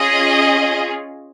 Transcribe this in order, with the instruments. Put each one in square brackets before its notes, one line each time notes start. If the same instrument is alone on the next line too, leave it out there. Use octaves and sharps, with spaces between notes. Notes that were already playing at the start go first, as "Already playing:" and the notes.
Already playing: [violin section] C#4 F4 G#4 D#5